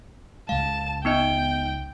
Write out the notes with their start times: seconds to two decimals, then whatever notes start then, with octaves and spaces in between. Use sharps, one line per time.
0.49 C#2 G#3 F5 A5
1.05 B3 D#4 D#5 G5